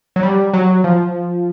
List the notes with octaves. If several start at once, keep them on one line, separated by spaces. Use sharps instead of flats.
F#3
G3
F#3
F3